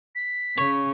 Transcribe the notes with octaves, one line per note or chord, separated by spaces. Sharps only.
B6
C#3 C#5